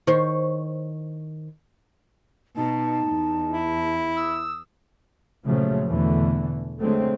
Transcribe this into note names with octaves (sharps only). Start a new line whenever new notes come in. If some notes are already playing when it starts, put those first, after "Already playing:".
D#3 C5 C#5
B2 D#4 A5
E2
E4
D#6 E6
A#2 C#3 F3 F#3 A3
E2 B2 D3 E3 A3
D3 F#3 G#3 A3 C4